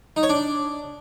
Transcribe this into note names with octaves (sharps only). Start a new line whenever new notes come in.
D#4
C#5
D4